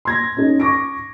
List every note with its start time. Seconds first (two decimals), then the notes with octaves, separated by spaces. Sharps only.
0.05 C6 G#6 A#6
0.37 C#4 D#4 A4
0.60 C#6 D6 A#6 D7